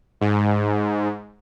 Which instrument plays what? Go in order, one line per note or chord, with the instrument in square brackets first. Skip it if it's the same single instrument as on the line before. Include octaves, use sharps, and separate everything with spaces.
[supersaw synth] G#2